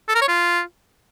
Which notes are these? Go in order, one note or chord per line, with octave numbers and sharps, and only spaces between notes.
A4
A#4
C#5
F4